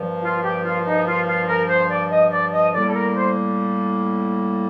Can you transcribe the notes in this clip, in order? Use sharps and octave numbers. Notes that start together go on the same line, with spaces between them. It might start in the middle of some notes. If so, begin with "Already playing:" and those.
Already playing: G2 F3 A#3
F4
G4
F4
D#4
F4
F4
A#4
C5
D5
D#5
D5
D#5
A2 G3 A#3 D5
A4
A#4
C5